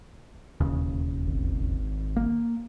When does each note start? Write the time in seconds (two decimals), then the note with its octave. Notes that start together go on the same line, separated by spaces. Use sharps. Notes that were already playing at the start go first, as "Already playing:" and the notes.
0.60 E1 D#2 C#3
1.27 G#1
2.17 A#3